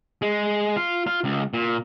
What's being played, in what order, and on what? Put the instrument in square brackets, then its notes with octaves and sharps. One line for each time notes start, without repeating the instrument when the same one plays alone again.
[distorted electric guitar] G#3
F4
F4
C#2
A#2